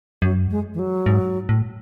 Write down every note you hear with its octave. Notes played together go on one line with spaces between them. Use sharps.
F#2 F#3
G#3
E3
F#3
G#2
A2